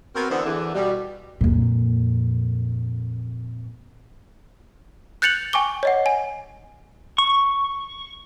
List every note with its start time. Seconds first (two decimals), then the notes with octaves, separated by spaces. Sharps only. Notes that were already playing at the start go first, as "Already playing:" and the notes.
0.15 B3 C4 F#4 A#4
0.30 D3 E3 B3 C4 D4 C5
0.45 E2 D3 E3
0.75 B2 G3
1.41 F2 A#2
5.22 F#6 G6 A6 C#7 F7 F#7
5.53 G5 G#5 C#6 D6 G7
5.83 C#5 D#5 F#5
6.06 G#5
7.18 C#6